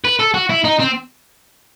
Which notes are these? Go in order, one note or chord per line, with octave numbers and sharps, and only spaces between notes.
B4
A4
F#4
E4
D#4
C4